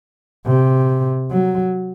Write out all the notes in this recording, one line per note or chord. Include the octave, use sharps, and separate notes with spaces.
C3
F#3